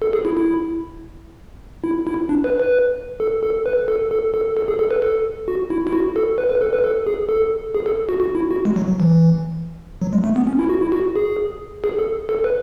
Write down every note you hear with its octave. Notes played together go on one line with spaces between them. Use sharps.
A4
G#4
E4
E4
E4
E4
D4
B4
B4
A4
A4
B4
A4
A4
A4
A4
G#4
A4
B4
A4
F#4
E4
E4
F#4
A4
B4
B4
A4
B4
A4
G#4
A4
G#4
A4
F#4
F#4
E4
F#4
G#3
F#3
F#3
E3
F#3
G#3
A3
B3
C#4
E4
F#4
E4
F#4
G#4
G#4
A4
A4
B4